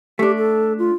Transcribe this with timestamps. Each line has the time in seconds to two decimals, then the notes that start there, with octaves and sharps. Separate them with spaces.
0.19 A3 D4 G4
0.37 A4
0.79 F4